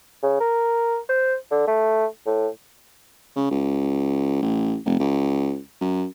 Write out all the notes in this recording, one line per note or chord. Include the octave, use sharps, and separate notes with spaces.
C#3
A#4
C5
D3
A3
A2
C#3
C#2
A1
F1
C#2
F#2